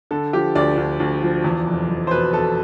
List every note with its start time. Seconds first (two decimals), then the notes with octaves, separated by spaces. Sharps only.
0.11 D3 A4
0.33 F3 G4
0.55 D2 D5
0.77 D2
1.00 D2
1.22 F3
1.44 E2
1.66 F1
1.89 F1
2.07 C5
2.11 B2 B4
2.33 B2 A4